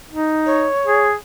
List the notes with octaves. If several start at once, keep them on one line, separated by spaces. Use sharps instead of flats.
D#4
C#5
G#4